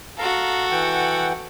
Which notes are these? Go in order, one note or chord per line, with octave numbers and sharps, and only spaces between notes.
F#4 A4 F5 A#5
E3 F#5 G5